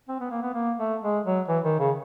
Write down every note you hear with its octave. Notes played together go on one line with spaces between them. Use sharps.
C4
B3
A#3
B3
A#3
A3
G#3
F#3
E3
D#3
C#3